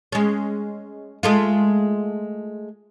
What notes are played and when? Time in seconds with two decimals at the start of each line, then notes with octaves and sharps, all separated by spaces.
0.12 G#3 C#4
1.23 G#3 A3 F4